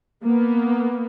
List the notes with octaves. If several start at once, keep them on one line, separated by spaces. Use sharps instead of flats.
A#3 B3